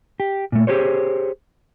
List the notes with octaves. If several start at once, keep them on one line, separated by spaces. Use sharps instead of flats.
G4
A#2 A3
G4 G#4 C5 C#5